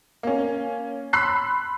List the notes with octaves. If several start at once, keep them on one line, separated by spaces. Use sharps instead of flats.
A#3 C#4
B5 C6 E6 F#6 B6 C7